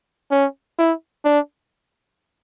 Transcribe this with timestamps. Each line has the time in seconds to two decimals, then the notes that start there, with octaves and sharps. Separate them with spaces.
0.31 C#4
0.79 E4
1.25 D4